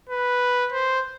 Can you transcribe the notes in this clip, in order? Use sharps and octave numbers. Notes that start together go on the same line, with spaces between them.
B4
C5